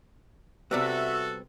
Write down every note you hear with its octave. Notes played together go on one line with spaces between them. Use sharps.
C3 G3 B3 F#4 A4 E5